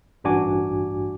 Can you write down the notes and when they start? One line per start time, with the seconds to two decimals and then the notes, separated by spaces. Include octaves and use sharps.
0.24 A1 G2 D4 F#4 G#5 D6